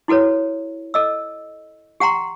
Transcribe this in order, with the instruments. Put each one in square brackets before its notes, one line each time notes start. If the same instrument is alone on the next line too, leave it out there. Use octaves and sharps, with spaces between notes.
[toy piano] E4 F#4 A4 B4 C#5
A4 D#5 E6
G4 F#5 G5 A#5 C6